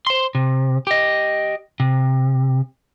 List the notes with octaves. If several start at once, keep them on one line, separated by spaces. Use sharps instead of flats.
C5 C6
C3
G4 D#5
C3